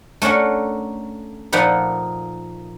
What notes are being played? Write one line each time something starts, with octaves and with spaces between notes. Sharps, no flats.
A3 C#4 D4 A#4 F#5
A#2 F3 A#3 D#4 F#5 B5